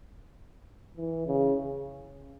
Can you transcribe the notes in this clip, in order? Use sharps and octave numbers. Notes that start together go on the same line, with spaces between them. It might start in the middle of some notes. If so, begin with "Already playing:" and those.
E3
C#3